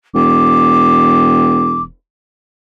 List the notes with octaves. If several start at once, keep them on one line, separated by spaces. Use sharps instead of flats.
E1 D6